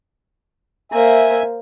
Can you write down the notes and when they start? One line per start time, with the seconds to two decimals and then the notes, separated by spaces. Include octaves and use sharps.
0.92 A#3 C5 E5 G#5